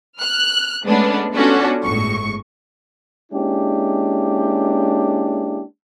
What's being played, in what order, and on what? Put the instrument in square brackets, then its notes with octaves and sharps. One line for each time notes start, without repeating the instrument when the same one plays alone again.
[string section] F6 F#6
G#3 A3 B3 C#4 D4
B3 C#4 D4 F4 F#4 A4
G1 A2 G#3 C#6
[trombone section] G#3 A#3 C#4 D4 E4 G4